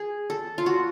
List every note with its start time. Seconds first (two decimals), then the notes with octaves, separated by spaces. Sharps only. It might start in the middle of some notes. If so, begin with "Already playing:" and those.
Already playing: G#4
0.30 A4
0.58 F4
0.66 F#4